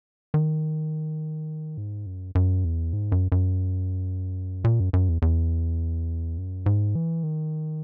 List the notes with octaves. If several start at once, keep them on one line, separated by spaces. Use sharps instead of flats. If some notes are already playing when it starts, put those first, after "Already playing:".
D#3
G#2
F#2
F#2
E2
G#2
F#2
F#2
A#2
F#2
F#2
E2
E2
F#2
G#2
E3
D#3